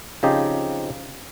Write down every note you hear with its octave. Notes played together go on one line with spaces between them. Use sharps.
C#3 F3 C4 D#4 G4